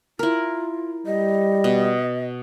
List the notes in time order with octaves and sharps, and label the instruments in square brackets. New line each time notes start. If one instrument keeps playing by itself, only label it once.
[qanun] E4 A#4 [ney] F4
[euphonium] G3 [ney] D#5
[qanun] B2